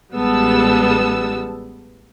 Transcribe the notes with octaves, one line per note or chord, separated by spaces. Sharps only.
A1 G3 G#3 B3 A5 E6